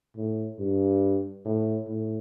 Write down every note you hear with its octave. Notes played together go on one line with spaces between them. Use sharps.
A2
G2
A2
A2